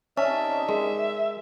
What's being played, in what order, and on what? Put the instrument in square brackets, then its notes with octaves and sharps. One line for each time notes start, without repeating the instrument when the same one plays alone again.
[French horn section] C3 D#4 D5 [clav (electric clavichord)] C#4 [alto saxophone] E5 [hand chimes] A5
[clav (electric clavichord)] G#3 [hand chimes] A#4